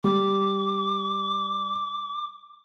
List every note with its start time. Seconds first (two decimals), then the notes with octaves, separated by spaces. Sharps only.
0.04 G3 D6